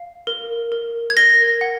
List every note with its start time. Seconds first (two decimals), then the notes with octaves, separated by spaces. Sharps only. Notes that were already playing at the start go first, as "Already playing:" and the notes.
Already playing: F5
0.27 A#4
0.72 A#4
1.10 G#6
1.17 A#4 A#6
1.61 F#5